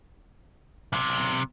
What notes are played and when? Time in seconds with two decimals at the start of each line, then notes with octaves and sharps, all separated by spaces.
0.93 B1 C3